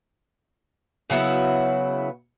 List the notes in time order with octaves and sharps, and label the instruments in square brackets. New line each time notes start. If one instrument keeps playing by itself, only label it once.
[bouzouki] C#3 F#3 B3 E4